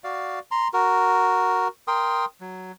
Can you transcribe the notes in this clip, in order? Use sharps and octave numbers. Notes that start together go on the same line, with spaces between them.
F#4 D5 F5
A#5 C6
F#4 A#4
A#4 G5 C6 D#6
F#3